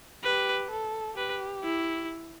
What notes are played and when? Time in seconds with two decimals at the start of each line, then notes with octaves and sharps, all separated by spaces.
0.24 G4 B4
0.71 A4
1.17 G4 B4
1.64 E4